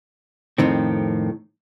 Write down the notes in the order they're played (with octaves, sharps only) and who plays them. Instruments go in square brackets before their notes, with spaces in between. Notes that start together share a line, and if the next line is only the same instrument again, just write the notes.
[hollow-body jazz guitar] F2 A2 D#3 C4